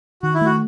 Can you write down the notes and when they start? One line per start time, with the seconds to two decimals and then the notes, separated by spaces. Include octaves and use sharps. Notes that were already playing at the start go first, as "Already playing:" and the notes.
0.23 D#3 F#4
0.34 E4
0.41 A3 F#4